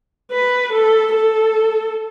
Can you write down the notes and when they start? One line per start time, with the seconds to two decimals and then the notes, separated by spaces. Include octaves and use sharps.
0.31 B4
0.73 A4
1.14 A4